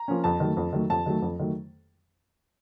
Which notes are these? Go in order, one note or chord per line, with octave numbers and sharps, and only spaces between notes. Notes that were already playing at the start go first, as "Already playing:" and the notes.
Already playing: A#5
F3 A#3 C#4
F2 A5
D#3 F#3 A3
F2
D#3 F#3 A3
F2 A5
D#3 F#3 A3
F2
D#3 F#3 A3